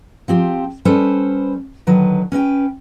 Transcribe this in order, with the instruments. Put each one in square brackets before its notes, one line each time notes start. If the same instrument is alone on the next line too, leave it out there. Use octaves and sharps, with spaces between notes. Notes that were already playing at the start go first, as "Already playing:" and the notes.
[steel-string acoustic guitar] F3 C4 G4
G3 C#4 A4 B4 C5
D3 D#3 F#3 B4
C#4 B4 D#5 G5